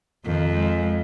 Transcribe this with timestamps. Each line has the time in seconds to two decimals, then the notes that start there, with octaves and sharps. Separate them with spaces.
0.25 F2 D#3
0.55 G#3